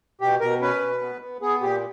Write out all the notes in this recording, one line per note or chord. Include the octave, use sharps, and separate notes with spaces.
B2 G4
B2 A#4
C#4 B4
B2
B3
B3
B3 G#4
A#2 G4